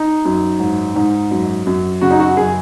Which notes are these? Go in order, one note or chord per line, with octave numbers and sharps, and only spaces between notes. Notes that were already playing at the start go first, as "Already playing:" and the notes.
Already playing: D#4
F#2
G#2
G#2
F#2
F#2
C#3 F#4
D#4
F#4
F#2 G#4